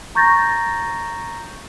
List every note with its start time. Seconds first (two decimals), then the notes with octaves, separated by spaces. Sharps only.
0.15 A#5 C#6 G6 A6 A#6